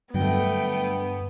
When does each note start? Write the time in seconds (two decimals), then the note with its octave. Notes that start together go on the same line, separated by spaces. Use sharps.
0.14 G2 D3 F#3 A3 B3 G5